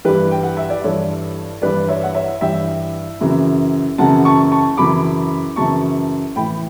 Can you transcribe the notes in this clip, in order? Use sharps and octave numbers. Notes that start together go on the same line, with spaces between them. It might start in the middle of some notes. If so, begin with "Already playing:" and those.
G2 E3 G4 B4
G5
F#5
E5
D5
G2 E3 A4 C#5
G2 E3 B4 D5
C#5 E5
F#5
C#5 E5
G2 E3 E5 G5
F#2 C#3 E3
F#2 C#3 E3 F#5 A5
A5 C#6
A5 C#6
F#2 C#3 E3 B5 D6
F#2 C#3 E3 A5 C#6
A2 E3 G5 B5